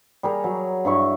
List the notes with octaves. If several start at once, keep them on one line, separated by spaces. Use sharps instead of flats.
G3 G#4 A#4
F#3
G2 E4 C#6